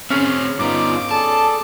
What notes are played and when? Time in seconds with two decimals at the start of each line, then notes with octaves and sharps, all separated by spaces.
0.10 C4 C#4 G#4
0.59 G2 B3 D#4 F4 D6
1.11 G#4 A4 D5 A5